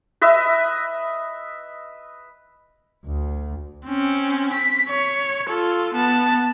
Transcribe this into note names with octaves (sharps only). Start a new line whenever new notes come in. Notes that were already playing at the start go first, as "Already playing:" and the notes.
B4 D#5 E5
D2
C4 C#4
B6
C#5
F4 A4
B3 A5